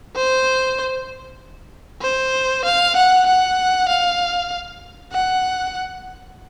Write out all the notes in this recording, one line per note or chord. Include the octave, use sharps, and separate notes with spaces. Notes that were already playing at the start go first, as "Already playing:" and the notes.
C5
C5
F5
F#5
F#5
F5
F#5